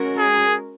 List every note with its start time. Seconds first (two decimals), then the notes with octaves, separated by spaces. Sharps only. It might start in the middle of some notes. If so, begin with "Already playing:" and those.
Already playing: G#3 C#4 F#4 A#4
0.18 G#4